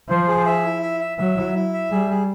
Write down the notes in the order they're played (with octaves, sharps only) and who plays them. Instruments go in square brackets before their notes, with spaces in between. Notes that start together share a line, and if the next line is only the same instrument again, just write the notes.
[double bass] F3 [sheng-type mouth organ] C5
[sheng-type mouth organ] G#4
E5
E4
E5
E5
[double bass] F#3 [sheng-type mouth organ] E5
[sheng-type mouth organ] E4
E4
E5
[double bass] G3 [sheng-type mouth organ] G#4
[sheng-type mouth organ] G#4